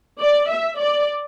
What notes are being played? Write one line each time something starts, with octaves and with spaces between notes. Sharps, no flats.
D5
E5
D5